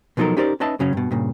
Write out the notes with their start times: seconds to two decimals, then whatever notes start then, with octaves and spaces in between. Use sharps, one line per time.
0.17 B2 F3 F#3 D#4 A4 A#4
0.37 C#4 D#4 G4 A#4 C5 D5
0.60 C#4 D#4 B4 D#5 E5 A5
0.79 F#2 C#3 F#3 C#4
0.93 G2 B2
1.11 G2 A#2 C#3